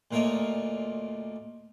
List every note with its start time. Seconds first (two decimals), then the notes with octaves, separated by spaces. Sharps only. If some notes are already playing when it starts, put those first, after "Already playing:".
0.11 D2 A#2 F4 A#4 C#5 D#5